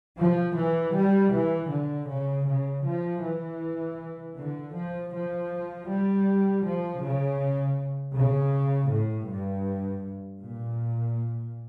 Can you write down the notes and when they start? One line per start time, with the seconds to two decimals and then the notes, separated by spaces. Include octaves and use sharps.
0.18 F3
0.55 E3
0.93 G3
1.32 E3
1.70 D3
2.08 C#3
2.45 C#3
2.83 F3
3.22 E3
4.35 D3
4.74 F3
5.12 F3
5.87 G3
6.64 F3
7.02 C#3
8.15 C#3
8.92 A2
9.30 G2
10.43 A#2